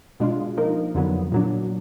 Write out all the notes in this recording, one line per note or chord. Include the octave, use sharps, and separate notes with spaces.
B2 G#3 D4 F4
F3 A#3 D#4 A#4
F2 D3 F#3 B3
A#2 F#3 D4